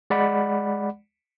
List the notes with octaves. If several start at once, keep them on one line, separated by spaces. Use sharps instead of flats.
G#3 D5 F#5 B5